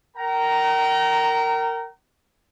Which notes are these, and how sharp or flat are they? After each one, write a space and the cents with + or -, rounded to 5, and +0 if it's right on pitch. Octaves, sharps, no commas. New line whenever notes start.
A#4 -15 G5 -40 A#5 +0